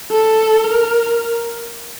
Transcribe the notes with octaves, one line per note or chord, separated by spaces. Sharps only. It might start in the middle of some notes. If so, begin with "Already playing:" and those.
A4
A#4